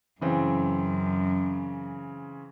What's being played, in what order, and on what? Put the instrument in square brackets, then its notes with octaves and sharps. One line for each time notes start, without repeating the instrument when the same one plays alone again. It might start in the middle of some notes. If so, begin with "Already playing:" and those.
[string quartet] F#2 [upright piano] C#3 E3 C4